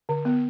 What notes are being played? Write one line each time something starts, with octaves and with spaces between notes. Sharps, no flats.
D3
B3